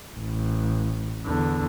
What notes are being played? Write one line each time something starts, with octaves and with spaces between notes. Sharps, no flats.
A1
E2 D3